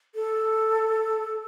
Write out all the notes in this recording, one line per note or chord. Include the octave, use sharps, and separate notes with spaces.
A4